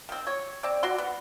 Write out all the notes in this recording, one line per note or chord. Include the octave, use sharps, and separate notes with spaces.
D#3 C4
C#5
C4 D5
F#4 D5 C6
B3